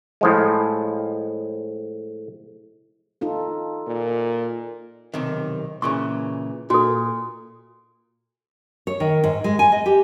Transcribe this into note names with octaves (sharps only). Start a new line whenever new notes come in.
A2 F3 G#3
D#4 F4 A4
A#2
B1 C3 D#3
A#2 C#3 E3 C#6
A#2 F#4 A4
C#5
D#3
G#2
G#3
G#5
D#5
G4